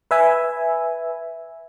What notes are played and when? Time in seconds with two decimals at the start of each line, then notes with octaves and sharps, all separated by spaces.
0.11 B4 E5 G#5